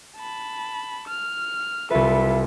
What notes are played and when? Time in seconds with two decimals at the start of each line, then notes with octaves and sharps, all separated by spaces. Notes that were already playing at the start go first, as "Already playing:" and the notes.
0.16 A5 B5
1.08 F6
1.90 C2 F4 A4 B4 E5